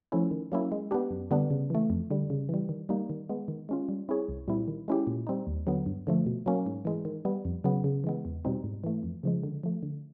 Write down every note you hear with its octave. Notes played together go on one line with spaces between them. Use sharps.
F3 A3 C#4 E4
D#3
F#3 A#3 C#4 E4
G#3
B3 D4 G4
F#2
D3 G3 B3 D4
C#3
E3 A3
F2
D3 G3
C#3
E3 G3
D#3
G3 A#3 D#4
D#3
G#3 B3
D#3
G#3 C#4 F4
G3
C4 E4 G#4 C#5
C2
A#2 G3 C4 E4
D#3
G#3 C#4 E4 G4
A#2
G3 C4 D#4
D#2
D3 F#3 B3
G2
D3 F3 A3
B2
F#3 A#3 C#4
G#2
E3 G#3
D#3
G3 B3
F2
C#3 F#3 B3
C#3
E3 G#3 B3
E2
B2 G3 C4 D#4
G#2
E3 A3
F2
C#3 F3 G#3
D3
F3 A3
D3